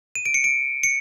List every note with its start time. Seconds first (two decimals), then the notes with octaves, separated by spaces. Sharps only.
0.15 D#7
0.26 D7
0.34 C#7
0.44 D7
0.83 C#7